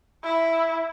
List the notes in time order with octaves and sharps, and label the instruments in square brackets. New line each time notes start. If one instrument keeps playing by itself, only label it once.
[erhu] E4